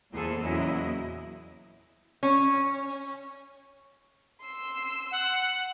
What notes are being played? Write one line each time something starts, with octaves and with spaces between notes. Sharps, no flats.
E2 A#2 G#4 A4 C5
E2 A#2 C#3 F#3 E4 D#5
C#4
C6 E6
F#5